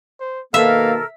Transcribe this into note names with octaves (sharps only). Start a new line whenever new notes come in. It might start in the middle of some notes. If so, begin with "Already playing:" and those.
C5
B2 D#3 A#3 A4 A#4 E5 F5